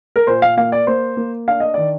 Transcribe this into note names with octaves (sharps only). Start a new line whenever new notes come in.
A#4
A#2 C5
F5
A#3 F5
D5
A#3 C5
A#3
D4 F5
D#5
D#3 D5